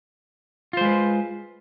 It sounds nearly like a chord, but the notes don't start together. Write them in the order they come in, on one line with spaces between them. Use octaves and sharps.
F4 C5 G#3 B4